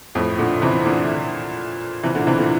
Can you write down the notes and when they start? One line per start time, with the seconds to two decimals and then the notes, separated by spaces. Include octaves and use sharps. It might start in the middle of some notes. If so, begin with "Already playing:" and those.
0.15 F2 A2
0.39 A#2 D3
0.62 C3 E3
0.86 A#2 D3
2.03 C3 E3
2.15 A#2 D3
2.27 C3 E3
2.38 A#2 D3